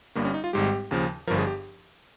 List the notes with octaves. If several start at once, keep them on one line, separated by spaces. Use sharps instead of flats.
G1 G2 G3 A#3
C#4
D#4
F4
G#1 G#2 G3 G4
D#2 C#3 F3
G1 G2 F3 A#4
G#4
G4